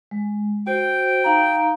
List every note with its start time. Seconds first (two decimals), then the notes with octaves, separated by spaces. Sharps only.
0.11 G#3
0.67 F#4 C5 G5
1.24 D#4 F5 A#5